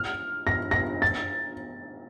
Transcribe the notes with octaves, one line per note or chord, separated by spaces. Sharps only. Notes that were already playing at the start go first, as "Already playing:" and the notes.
Already playing: F6
A#6
A#6
A6